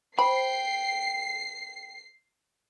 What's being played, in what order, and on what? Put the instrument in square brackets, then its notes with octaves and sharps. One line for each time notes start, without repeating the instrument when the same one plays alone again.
[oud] C5 [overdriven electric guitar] G5 [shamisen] B5 [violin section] C7